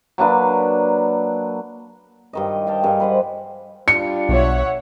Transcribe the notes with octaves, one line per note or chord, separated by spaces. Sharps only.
F#3 A#3 D4 B4
G2 D#3 D#5
F5 G5 A5
G2 D#3 G#4
B4 C5 F#5
G3 D4 F4 C#7
B1 C#5 E5 F#5